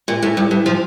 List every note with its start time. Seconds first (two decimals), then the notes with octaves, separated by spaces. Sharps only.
0.08 A#2
0.23 A2
0.37 G2
0.51 G2
0.66 F3